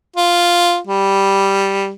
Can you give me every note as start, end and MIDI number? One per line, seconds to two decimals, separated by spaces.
0.16 0.77 65
0.87 1.91 55